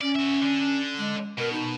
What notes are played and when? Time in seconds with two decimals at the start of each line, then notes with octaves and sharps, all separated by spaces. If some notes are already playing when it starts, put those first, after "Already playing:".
0.01 C#4 D5
0.16 F#4 E5
0.42 D3 D4
0.98 G#3
1.38 B2 A#4
1.53 D#4